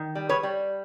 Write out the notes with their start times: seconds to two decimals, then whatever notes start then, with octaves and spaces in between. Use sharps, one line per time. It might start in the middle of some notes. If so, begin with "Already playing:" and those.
Already playing: D#3
0.15 G3
0.29 B4 C#5
0.43 G3